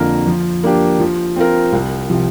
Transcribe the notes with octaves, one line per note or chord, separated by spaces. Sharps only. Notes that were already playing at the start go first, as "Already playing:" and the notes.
Already playing: F2 D3 A#3 F4 A#4
F3
A#3 D4 G4
F3
C4 F4 A#4
C2
C3 F3